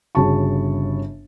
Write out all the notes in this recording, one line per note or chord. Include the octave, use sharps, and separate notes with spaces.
G1 C#3 F#4 A5 C#6